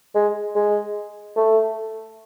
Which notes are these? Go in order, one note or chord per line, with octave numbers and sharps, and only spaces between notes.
G#3
G#3
A3